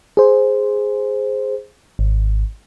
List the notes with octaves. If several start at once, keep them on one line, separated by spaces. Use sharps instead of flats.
G#4 C5
G#1